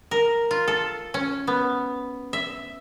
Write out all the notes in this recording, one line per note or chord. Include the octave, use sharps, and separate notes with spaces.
A#4
F4
A4
C#4
B3
E5